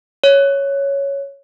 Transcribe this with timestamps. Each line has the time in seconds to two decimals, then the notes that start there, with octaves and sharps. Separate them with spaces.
0.24 C#5